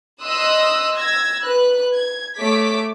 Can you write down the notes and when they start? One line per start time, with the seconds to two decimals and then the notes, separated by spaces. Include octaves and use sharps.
0.23 D#5 C6 D#6 E6 F#6
0.96 E6 G#6 A#6
1.43 B4 F#6
1.93 G#6
2.38 A3 C#5 D6 B6